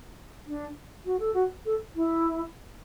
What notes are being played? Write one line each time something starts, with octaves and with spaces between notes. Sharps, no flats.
D4
F#4
A4
F#4
A4
E4